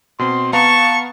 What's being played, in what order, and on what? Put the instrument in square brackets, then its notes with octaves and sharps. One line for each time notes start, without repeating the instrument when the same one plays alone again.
[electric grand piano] B2 C4 [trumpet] C6
[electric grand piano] B3 F5 A#5 [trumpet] A5 [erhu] C#6